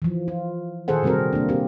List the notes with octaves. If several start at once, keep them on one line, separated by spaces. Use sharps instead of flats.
E3 F3
F4
A#2 D#3 G#4 A4 C5 F#5
C3 G3 C4 F#4 A#4
A#3 D4
C4 G4